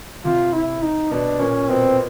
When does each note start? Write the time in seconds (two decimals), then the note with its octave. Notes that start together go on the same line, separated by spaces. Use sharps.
0.24 C3 F4
0.53 E4
0.83 D#4
1.11 B2 D4
1.39 A#2 C#4
1.68 B2 C4